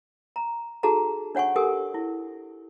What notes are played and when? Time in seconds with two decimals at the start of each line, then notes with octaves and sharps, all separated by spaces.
0.36 A#5
0.83 D#4 F#4 G#4 A4 A5 A#5
1.35 D4 C#5 F#5 G#5 C#6
1.56 G4 A4 A#4 G#5 D#6
1.94 E4